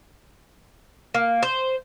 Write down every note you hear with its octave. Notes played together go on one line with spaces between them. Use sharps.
A#3
C5